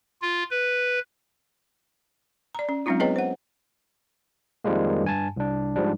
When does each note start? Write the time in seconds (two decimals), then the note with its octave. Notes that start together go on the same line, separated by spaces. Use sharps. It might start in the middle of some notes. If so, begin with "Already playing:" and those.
0.21 F4
0.50 B4
2.55 D5 A#5
2.69 C#4
2.86 F#3 G#3 C4 C#4 D#4 F4
3.00 B3 G#4 B4 C#5 D#5 G5
3.16 C5 F#5
4.64 F2 D#3 F3 G3 G#3 A#3
5.04 G2 G#5 A5
5.37 C2 D4
5.76 G#2 F3 G3 D4